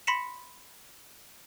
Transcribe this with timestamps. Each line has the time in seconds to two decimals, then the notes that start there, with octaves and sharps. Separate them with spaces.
0.07 B5 C6 A#6 B6 C#7 E7